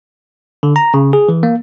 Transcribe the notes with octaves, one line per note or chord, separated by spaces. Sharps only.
D3
A#5
C#3
G#4
E3
A#3